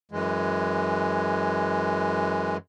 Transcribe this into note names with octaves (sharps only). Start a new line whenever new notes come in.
F#2 E3 G#3